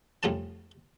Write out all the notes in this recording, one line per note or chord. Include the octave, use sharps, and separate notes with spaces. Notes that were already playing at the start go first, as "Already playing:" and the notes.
C2 F2 A3 C#4 G#5 A5